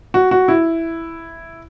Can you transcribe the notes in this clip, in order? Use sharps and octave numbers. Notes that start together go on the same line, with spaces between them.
F#4
F#4
E4